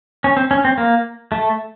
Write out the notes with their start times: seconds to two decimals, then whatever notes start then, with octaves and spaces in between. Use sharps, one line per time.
0.24 C#4
0.37 C4
0.51 C#4
0.65 C4
0.78 A#3
1.32 A3